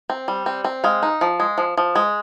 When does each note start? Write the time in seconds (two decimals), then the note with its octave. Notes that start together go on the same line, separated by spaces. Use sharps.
0.10 C4
0.28 G3
0.46 C4
0.64 C4
0.84 G#3 F5
1.03 D#4
1.21 F3
1.40 G#3
1.58 F3
1.77 F3
1.95 G#3